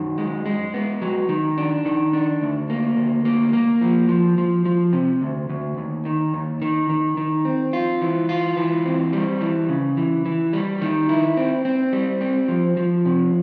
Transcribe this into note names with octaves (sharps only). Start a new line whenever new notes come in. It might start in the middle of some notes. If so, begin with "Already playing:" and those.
Already playing: F#2 D#3
G#3
G#3
B3
F#3
D#3
D4
D#3
D4
D2
A#3
D2
A#3
A#3
F3
F3
F3
F3
C3
D2
D2
D#2
D#3
D#2
D#3
D#3
D#3
C4
F4
E3
F4
E3
C4
G3
E3
C#3
E3
E3
G3
D#3
E4
C4
C4
G3
C4
F3
F3
C3